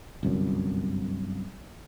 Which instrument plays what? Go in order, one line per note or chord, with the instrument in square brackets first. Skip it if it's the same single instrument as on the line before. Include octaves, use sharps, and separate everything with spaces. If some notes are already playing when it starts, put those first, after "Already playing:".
[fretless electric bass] G1 C2 F#2